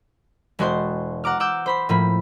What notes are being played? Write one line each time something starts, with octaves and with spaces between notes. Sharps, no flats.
E1 G#3 F#4 C5 C6
F#5 A#5 D6 F6
F#5 D6 E6 G6
C5 B5 C6
A2 F3 A#3 B5